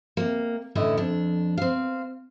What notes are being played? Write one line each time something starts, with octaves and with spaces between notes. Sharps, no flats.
C3 A#3
A2 D3 E3 C#4 E4 D#5
F2 D4
C4 F5